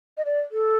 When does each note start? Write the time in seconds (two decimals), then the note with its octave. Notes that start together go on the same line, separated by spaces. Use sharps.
0.17 D#5
0.25 D5
0.52 A4